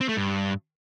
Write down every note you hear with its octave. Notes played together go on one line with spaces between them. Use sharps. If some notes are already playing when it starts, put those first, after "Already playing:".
C4
A3
G2